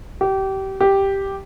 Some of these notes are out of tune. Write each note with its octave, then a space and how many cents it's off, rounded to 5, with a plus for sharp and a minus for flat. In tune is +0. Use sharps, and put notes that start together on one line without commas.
G4 -25
G4 +0